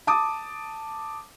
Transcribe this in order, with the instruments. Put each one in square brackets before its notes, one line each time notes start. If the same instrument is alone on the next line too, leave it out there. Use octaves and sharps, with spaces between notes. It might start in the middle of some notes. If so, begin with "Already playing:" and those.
[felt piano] A5 D6 D#6